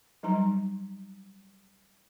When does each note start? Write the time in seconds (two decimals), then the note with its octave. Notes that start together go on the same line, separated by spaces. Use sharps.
0.23 F#3 G3 D#4 A#5